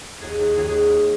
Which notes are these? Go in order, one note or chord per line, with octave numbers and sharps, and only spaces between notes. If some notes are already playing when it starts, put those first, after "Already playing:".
D#2 G#4
D#2
D#2 G#4
G#4